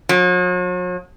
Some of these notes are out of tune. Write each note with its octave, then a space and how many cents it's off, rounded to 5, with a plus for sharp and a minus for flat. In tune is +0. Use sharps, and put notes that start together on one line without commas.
F#3 -45